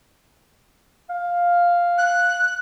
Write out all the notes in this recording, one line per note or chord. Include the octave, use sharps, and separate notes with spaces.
F5
F#6